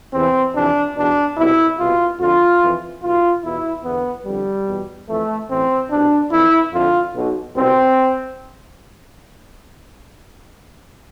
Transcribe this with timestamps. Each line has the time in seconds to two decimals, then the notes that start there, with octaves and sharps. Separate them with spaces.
0.13 E2 C3 E3 C4
0.55 F2 C3 E3 D4
0.96 E2 B2 D4
1.38 C2 B2 E4
1.79 C2 B2 F4
2.20 F2 D3 F4
2.62 F2 E3
3.02 B1 B2 F4
3.44 E2 B2 E4
3.84 E2 D3 B3
4.25 F2 D3 G3
4.67 E2 B2
5.08 F2 E3 A3
5.49 A1 A2 E3 C4
5.90 C2 B2 D4
6.32 F2 E3 E4
6.73 F2 D3 F4
7.15 B1 B2
7.56 C2 B2 C4